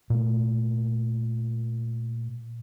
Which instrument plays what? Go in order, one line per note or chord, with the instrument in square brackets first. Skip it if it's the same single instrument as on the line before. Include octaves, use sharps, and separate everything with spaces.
[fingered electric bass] A#2 A3